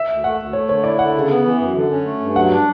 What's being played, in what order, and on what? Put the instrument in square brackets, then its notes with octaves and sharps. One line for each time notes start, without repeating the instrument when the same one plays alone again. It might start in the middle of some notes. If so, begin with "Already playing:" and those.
Already playing: [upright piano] E5
[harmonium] D2
[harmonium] A3 [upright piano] F#5
[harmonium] D2
[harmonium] A3 [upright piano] C#5
[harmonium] D3 [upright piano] C#5
[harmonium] E4 [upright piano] D5
[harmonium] D3 [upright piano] F#5
[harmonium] C#3
B3
E3
F#2
D3
C#4
A3
G2
[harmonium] F#3 [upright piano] F#5
[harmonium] D4